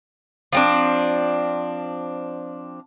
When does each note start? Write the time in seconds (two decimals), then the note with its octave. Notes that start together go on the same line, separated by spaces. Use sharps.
0.53 F3 C4 D4